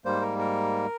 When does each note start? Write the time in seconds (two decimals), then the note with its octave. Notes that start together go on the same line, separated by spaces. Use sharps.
0.05 G#2 G3 A#3 C5
0.21 A#4
0.39 A#4